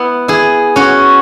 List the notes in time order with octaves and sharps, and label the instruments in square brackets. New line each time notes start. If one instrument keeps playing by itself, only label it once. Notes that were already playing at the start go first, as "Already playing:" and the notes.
Already playing: [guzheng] B3 E4
E4 G#4
C#4 F#4